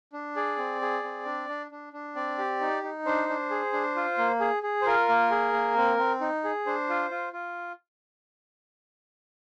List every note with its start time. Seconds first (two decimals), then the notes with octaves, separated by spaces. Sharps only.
0.13 D4
0.36 G#4 D5
0.58 C4
0.81 G#4
1.03 C4
1.25 D4
1.49 D4
1.71 D4
1.93 D4
2.15 C4 D5
2.38 G4
2.61 D#4
2.83 D#4
3.05 D4 C5
3.29 D4
3.50 G#4
3.73 D4
3.96 F4
4.18 A#3
4.40 G#4
4.63 G#4
4.82 C5
4.86 F4 A#4
5.09 A#3
5.30 G#4
5.53 A#3
5.76 C4
5.98 C4
6.21 D#4
6.44 G#4
6.66 D4 C5
6.89 F4
7.11 F4
7.33 F4